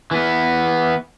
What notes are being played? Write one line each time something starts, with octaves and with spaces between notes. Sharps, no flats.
E3 B3